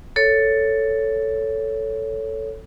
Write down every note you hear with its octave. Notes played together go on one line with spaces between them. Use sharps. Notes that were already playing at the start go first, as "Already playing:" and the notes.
A4 C#5